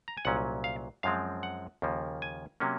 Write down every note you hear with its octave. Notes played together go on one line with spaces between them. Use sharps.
A#5
G#5
C2 A#2 F#3 C#4 F#5
F5
F#2 F3 G#3 C4 F5
F#5
D#2 C#3 F3 A#3
G#5
C3 F#3 A#3 C#4